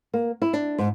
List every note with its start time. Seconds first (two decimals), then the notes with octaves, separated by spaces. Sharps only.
0.14 A#3
0.42 E4
0.53 D4
0.78 G#2